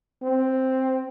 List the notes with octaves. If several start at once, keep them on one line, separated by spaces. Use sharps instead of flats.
C4